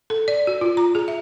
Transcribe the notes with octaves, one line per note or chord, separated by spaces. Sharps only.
A4
D5
F#4
F4
A#5
G#4
E5